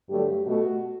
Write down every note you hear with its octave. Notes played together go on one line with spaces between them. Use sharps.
G2 D3 F#3 A3 G4
B2 A3 F#4